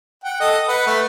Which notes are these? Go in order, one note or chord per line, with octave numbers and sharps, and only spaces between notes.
F#5 G5
A4 D#5
B4 F#5
A3